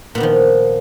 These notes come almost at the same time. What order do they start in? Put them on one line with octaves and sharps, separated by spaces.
A#2 B3 D#3 F3